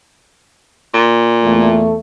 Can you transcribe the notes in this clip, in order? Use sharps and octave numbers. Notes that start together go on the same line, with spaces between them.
A#2
E2 A3